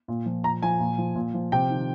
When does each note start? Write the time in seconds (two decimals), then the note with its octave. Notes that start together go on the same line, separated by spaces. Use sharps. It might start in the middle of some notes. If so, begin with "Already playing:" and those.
0.08 A#2
0.26 F3
0.44 A#2 A#5
0.63 F3 G#5
0.80 A#2
0.98 F3
1.15 A#2
1.34 F3
1.52 C3 G5
1.70 D#3